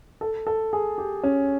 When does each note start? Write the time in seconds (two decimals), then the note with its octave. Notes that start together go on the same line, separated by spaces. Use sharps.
0.21 A4
0.47 A4
0.73 G#4
0.98 G4
1.23 C#4